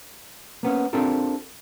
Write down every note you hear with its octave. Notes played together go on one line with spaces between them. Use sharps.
A#3 B3 C#4
C4 D4 F4 G4 A4 A#4